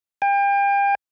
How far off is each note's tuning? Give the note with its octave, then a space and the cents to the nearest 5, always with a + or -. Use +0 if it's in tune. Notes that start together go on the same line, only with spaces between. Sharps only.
G5 +35